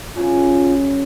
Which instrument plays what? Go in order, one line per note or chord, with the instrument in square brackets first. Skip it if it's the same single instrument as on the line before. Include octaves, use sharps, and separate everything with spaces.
[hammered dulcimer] F#2 C#3 [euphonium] F4